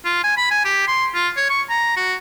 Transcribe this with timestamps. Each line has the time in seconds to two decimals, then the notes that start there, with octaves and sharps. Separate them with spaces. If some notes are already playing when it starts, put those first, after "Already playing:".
0.05 F4
0.24 G#5
0.37 B5
0.51 G#5
0.65 G4
0.88 C6
1.15 F4
1.37 C#5
1.49 C#6
1.70 A#5
1.97 F#4